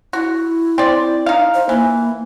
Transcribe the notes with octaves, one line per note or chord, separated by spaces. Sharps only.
E4 F#4
C4 D5
D#4 F5
C5
E3 A#3